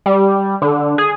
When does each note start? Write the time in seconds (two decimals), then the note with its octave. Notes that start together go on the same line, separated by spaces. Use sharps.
0.06 G3
0.62 D3
0.98 G#4